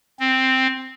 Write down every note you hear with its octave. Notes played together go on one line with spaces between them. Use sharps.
C4